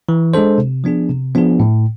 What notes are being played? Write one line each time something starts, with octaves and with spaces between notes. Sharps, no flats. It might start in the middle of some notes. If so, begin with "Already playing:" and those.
E3
G#3 D4 A4 C5
C3
F3 B3 D4 G#4
C3
F3 B3 D4 G#4
A2